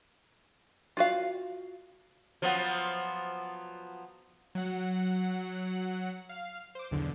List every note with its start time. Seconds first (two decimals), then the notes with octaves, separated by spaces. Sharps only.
0.97 F4 F#4 F5
2.42 F3 F#3 B3
4.55 F#3 F#5
6.29 F5
6.75 C5 D6
6.91 B1 E2 D3